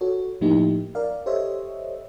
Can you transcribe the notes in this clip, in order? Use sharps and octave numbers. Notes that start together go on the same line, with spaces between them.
F#4 A4 C#5
A2 F3 A#3 D#4 E4 G4
A#4 D5 F5
G4 A4 C5 C#5 D#5 E5